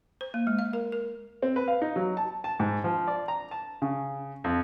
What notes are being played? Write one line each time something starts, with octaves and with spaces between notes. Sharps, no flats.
C5
A#3
G#3
F5
A#4
A#4
C4
B4
F5
D#4
F#3
A5
A5
G#2
F3
D5
A#5
A5
C#3
F2